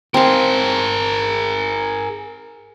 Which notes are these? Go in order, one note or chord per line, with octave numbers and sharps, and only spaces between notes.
C4 G#4 A#4 F5